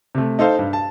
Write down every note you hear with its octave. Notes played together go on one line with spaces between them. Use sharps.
C3 A3
D#4 A4 C5 F5
G2
A5